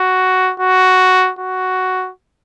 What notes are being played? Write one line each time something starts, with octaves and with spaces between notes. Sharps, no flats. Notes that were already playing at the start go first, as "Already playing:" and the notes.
Already playing: F#4
F#4
F#4